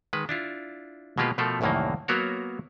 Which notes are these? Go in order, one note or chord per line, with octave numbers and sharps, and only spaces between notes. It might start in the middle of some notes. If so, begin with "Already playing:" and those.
D#3 G#3 B4
D4 E4 F4
B2 G#3 A#3 F4 G4 B4
B2 F3 A3 F4 A4 A#4
C2 F#2 A2 D#3 E3 A#3
F#3 A#3 B3 F#4 A#4 C#5